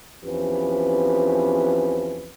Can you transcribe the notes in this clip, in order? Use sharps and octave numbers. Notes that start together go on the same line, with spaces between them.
E2 F3 C4 C#4 G4 B4